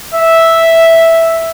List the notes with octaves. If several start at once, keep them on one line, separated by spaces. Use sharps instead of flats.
E5